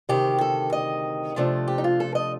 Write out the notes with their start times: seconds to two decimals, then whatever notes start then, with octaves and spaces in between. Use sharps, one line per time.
0.09 D2 C3 D#3 G4
0.41 A4
0.73 D#5
1.36 C3 F3 A3 D4
1.68 G4
1.78 D#4
1.84 F4
2.00 A4
2.15 D#5